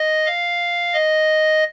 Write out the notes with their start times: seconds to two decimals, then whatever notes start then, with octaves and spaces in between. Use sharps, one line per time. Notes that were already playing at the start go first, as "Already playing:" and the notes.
Already playing: D#5
0.26 F5
0.93 D#5